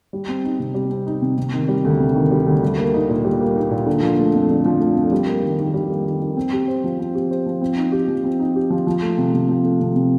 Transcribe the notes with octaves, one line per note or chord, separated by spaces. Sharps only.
G3
C4
D#4
C3
G3
C4
D#4
C3
C3
D#3
G3
D2
C3
D#3
G3
D2
G3
A#3
D#4
A#2
G3
A#3
D#4
A#2
D3
F3
A3
F2
D3
F3
A3
F2
G3
A#3
D#3
D#3
G3
A#3
D#3
D#3
C4
G4
C5
F3
C4
G4
C5
F3
C4
D#4
G4
F3
C4
D#4
G4
F3
F3
A3
C3
C3
F3
A3
C3
C3